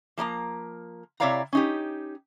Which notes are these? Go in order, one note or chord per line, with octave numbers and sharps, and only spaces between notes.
F3 A#3 D5 A#5
C3 E4 C#5 D5 F5 A#5
C#4 D#4 G4